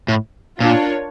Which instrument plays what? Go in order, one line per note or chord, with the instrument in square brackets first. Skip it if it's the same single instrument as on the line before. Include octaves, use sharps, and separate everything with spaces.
[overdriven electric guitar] A2
[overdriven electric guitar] A#2 [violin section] D4 F4 A#4 C#5